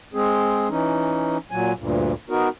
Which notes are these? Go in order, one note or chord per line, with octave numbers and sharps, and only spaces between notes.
G#3 C4 G#4
E3 C#4 D#4
A#2 F#3 G#5
D2 G2 A#2
B3 D#4 F#4 A#4